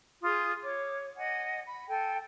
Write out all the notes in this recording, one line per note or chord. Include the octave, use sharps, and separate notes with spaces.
F4 G#4 D#6
C#5 D6
D#5 F#5 G#5
B5
A4 G5 G#5